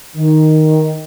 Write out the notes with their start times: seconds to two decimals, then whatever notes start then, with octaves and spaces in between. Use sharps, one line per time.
0.14 D#3